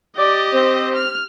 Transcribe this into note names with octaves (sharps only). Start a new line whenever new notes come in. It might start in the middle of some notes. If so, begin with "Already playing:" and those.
G4 D5 D#5
C4
F6